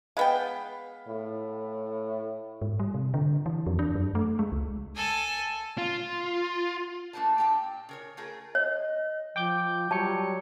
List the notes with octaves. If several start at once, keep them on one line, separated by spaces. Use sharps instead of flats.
G#3 B3 F5 G5 B5
A2
G#2
G3
C3
D3
E3
F2
D4
F#2
A3
G#3
C#2
A4 G#5
F4
A3 A#3 D4 A#4 C5 A5
A#2 G4 G5 A5
C#3 A#4 C#5
A3 F4 G#4 A#4
C#5 D#5
F3 G5 D6 G6
F#3 G3 C#5 A5 C#7